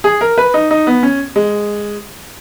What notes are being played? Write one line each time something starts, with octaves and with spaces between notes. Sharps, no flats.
G#4
A#4
B4
D#4
D#4
B3
C#4
G#3